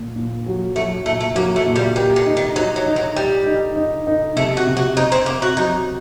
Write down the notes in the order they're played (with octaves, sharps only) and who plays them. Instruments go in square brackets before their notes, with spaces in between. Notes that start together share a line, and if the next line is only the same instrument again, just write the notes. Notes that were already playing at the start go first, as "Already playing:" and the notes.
Already playing: [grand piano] A#2
A#2
F#3
[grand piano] F#3 [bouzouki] A3
[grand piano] A#2 [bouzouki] A3
[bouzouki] A3
[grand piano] F#3 [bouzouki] A#3
[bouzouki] A3
[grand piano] A#2
[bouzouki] G3
[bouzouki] D#3 [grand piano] G4
[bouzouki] D3
[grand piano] D#4
[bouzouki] D#3
[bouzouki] F#3 [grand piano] D#4
[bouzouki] F#3
[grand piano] D#4
[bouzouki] F#3
[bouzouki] G3 [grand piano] G4
[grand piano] D#4
D#4
D#4
[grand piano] C3 [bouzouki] A3
[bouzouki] F#4
[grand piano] C3
[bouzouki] F#4
[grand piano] C3 [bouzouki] D#4
[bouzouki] C4
[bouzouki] A#3 [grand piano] C4
[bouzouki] F#4
[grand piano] F#3 [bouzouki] D#4